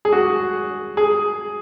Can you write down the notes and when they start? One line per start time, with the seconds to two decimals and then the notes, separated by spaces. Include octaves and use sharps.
0.05 G#4
0.13 F#4
0.97 G#4